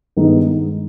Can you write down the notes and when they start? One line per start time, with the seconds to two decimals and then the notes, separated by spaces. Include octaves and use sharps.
0.16 G2 D#3 G#3 B3 D#4